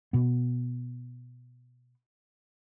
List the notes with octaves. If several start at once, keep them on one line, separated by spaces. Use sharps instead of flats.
B2 B3